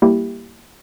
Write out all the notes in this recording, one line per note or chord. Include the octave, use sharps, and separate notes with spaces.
G3 A#3 E4 G4